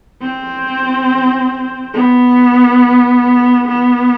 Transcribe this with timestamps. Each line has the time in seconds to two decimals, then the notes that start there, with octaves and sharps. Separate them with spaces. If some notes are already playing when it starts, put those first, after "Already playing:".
0.21 C4
1.94 B3
3.68 B3